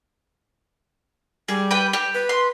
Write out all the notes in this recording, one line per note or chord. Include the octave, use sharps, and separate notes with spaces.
G3 G#4
B4 G5
G4
B4
C6